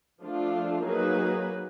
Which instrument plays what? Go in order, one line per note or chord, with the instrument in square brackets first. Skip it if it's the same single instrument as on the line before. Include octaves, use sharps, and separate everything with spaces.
[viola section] F3 A3 D4 F4
F#3 A#3 D#4 G#4 B4